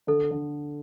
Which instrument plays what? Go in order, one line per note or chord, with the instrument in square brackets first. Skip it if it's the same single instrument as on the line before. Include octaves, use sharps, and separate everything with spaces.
[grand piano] D3 [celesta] A4
[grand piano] D3